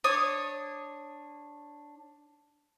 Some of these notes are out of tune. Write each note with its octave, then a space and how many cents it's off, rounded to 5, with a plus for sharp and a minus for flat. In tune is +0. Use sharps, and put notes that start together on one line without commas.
D4 +0 C#5 -20 D#6 +0